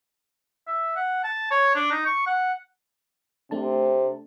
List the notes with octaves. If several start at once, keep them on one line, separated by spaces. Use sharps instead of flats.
E5
F#5
A5
C#5
D4
D#4
C#6
F#5
C3 A3 C4 D4 A5